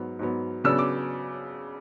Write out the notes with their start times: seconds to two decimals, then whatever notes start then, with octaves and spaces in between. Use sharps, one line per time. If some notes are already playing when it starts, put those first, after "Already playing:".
Already playing: G#2 F#3 B3
0.19 G#2 F#3 B3
0.64 C#3 F#3 B3 D4 E6
0.79 D6